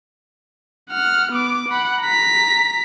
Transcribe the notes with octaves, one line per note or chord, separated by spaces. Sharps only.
F#5 F6
B3 D6
F#5 B5
A#5 B6